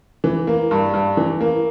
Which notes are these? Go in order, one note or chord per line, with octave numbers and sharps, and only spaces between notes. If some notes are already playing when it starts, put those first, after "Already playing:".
E3
A#3
G2
G2
E3
A#3